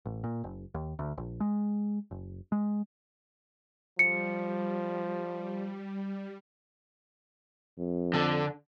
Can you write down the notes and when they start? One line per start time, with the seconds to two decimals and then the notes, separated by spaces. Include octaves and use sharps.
0.06 A1
0.24 A#2
0.44 F#1
0.74 D#2
0.99 D2
1.18 A#1
1.40 G#3
2.11 F#1
2.52 G#3
3.99 F3 G3 C#7
7.79 F2
8.14 D3